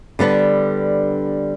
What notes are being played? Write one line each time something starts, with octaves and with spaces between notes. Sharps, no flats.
D3 G3 B3 D4